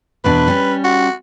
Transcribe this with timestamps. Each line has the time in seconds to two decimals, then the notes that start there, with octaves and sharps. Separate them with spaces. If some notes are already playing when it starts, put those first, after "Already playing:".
0.24 E2 B2 D4 B4
0.48 G3 C#4
0.84 F#4